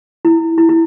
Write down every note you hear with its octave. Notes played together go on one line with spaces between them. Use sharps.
E4
E4
E4